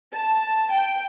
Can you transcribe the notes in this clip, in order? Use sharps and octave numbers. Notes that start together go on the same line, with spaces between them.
A5
G5